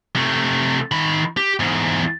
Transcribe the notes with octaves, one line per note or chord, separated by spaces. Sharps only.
C3 A3
D#3 B5
G4
E2 G#2